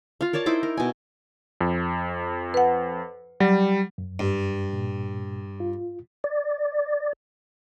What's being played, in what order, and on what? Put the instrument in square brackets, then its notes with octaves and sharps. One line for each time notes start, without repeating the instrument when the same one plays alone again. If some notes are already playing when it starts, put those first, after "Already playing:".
[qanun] F4 F5
A#4 C#5 D5 A5
D#4 E4 C5 D6
A#4
B2 G#5
[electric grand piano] F2
[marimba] B4 F#5
[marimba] F#3 [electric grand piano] G3
[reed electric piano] F#2
[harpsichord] G2
[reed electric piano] A#2
F4
[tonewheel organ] D5